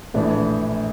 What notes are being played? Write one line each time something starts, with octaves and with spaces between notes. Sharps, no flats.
A#1 A2 E3 A3 D4